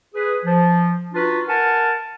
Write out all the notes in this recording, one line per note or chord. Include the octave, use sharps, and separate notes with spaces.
G#4 B4
F3
D4 D#4 F4 F#4 B4
A#4 F#5 G#5 A5